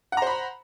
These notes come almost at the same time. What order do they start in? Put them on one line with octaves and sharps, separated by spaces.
F#5 A#5 C5 B5